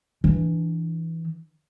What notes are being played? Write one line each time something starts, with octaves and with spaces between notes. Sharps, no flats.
E3 D4